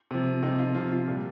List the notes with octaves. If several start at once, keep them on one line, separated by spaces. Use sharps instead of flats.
C3 F3
C3 F3 D#4
F4
C3 F3 F4
F4
A#2 G3